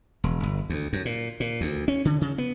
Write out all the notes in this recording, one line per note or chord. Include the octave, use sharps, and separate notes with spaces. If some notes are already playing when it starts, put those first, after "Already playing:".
E1
G1
D2
F#2
A#2
A#2
D2
C#4
D3
C#3
B3